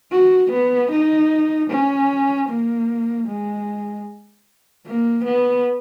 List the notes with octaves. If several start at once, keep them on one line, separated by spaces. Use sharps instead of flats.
F#4
B3
D#4
C#4
A#3
G#3
A#3
B3